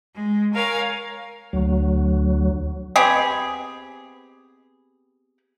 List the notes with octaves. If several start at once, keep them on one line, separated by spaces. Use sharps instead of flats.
G#3
A#4 C#5 F5 G#5
D2 F#3
B3 C4 G4 G#4